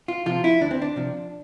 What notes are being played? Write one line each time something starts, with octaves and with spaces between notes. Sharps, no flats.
F4
C3 F3 F4
E4
D2 D4
C4
D4
C3 F3